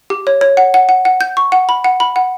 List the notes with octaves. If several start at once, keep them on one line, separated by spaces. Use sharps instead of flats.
G4
C#5
C#5
F#5
F#5
F#5
F#5
G6
C#6
F#5
B5
F#5
B5
F#5